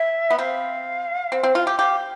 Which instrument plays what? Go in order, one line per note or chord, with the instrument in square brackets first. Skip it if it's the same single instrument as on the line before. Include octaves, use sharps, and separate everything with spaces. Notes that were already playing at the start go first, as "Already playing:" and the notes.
Already playing: [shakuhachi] E5
[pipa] B3
[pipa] C4 [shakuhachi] F5
[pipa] C4
C4
F4
G4
[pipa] G4 [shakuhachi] F5